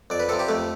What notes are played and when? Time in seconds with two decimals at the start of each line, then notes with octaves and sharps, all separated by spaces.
0.10 F2 D5
0.20 B4
0.29 C3 F3 A4
0.39 G4
0.48 F2 A3